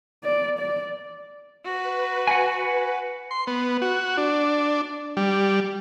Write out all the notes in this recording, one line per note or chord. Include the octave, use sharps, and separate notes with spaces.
D5
D5
F#4 B4
F#5 G#5
C6
B3
F#4
D4
G3